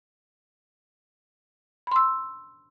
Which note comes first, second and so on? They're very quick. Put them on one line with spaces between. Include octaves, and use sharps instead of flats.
B5 C6 E6